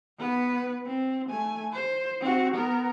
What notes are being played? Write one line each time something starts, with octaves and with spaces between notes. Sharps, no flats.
B3 B4
C4
A3 G#5
C5
C4 F#4
B3 A#4